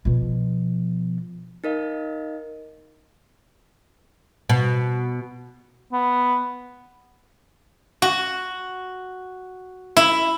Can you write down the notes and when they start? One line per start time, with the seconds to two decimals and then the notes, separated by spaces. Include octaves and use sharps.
0.05 B2 F3
1.64 D#4 A#4 D#5 F5
4.49 B2
5.93 B3
8.02 F#4
9.97 E4